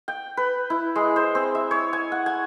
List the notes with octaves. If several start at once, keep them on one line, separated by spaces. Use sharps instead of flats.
G5
B4
E4
G#3
C5
C4
E5
C#5
G#5
F#5
G#5